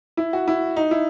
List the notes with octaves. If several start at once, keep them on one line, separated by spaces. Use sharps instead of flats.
E4
F#4
E4
D#4
E4